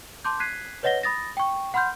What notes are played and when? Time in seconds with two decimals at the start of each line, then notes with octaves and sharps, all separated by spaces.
0.24 A5 C6 D6 G6
0.40 F#6 G#6 B6 C7 D#7
0.83 B4 C#5 D#5 F#5 A#6 G7
1.03 B5 D#6 A6 A#6
1.37 G5 C#6
1.74 F#5 B5 C6 F6 G6